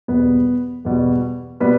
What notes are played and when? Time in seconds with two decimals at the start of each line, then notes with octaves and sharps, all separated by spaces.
0.08 E2 B2 G3 B3 B4
0.85 E2 B2 G3
1.60 B2 G3 B3 B4